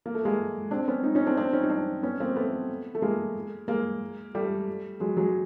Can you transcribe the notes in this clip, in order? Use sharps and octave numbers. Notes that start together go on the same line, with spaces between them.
A#3
A3
G#3 A#3
C4 D4
B3 C#4
C#4 D#4
C#4 D#4
C4 D4
C4 D4
C#4 D#4
D#4
C4 D4
B3 C#4
A#3 C4
A3 B3
A3
G#3 A#3
G#3 A#3
G3 A3
F#3 G#3
F#3 G#3